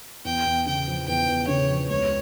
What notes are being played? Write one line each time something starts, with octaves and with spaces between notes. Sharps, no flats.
E2 G5
E2
C#3 G5
F3
E2 G5
E2
C#3 C#5
F3
C#2 C#5